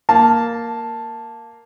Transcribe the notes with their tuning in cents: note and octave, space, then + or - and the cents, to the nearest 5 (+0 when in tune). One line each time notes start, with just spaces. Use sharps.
A#3 +0 A5 +0